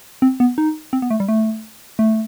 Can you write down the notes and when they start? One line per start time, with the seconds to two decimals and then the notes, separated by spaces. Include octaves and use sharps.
0.22 C4
0.40 B3
0.58 D#4
0.93 C4
1.02 B3
1.10 A3
1.20 G3
1.28 A3
1.99 A3